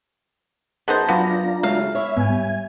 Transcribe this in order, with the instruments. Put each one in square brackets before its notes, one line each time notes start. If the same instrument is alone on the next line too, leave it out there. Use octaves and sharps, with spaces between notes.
[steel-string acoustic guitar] F#2 A5 [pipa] B3 D#4 C5 [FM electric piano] G#4 A#4 D#5
[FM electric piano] F#3 F5 D6 [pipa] B3 [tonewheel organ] D4 F4 A#5
[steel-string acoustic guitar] C#3 F#3 A3 [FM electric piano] G#3 [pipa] F5
[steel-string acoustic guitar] E4 C#5 [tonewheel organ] E5
[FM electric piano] G#2 B3 [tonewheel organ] G#5
[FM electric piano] G3